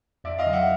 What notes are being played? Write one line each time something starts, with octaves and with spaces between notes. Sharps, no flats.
F2 D5 E5
D#5 F5
D3 F#3
E5 F#5